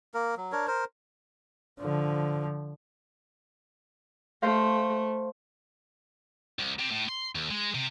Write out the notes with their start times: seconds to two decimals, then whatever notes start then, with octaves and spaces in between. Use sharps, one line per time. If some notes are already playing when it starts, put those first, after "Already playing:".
0.14 A#3 A#4
0.37 F#3
0.52 D4 A#4 C#5
0.67 A#4 C5
1.80 D3 F3
4.42 A3 C5 F5
6.59 C2
6.79 C3
6.91 A2
7.09 C6
7.35 D#2
7.51 G#3
7.75 C3